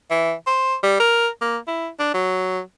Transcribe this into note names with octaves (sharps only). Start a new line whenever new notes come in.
E3
C5
G3
A#4
A#3
E4
D4
F#3